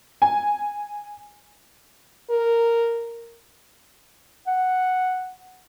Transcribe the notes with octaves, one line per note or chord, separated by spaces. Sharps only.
G#5
A#4
F#5